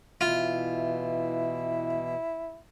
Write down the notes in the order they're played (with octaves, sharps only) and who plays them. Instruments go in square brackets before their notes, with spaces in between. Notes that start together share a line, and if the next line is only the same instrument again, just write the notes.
[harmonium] B2 E3 [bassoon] E4 [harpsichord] F4